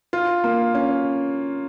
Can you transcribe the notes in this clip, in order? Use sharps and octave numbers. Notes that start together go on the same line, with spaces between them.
F4
A#3
C#4